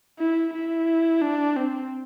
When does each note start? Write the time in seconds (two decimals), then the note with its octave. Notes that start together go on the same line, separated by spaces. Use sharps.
0.19 E4
0.53 E4
1.22 D4
1.57 C4